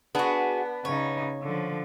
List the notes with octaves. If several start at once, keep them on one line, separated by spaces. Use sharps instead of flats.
B3 D4 F#4 G#4
C#3 D#4 C#5
D3 F3